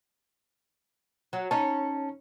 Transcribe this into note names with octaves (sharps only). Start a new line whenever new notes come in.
F#3
C#4 D#4 A5